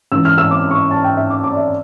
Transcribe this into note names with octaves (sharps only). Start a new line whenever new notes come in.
C#2 C#3 E3 E6
F6
E6
D6
C#6
A5
G5
E5
D6
D6
D5
E5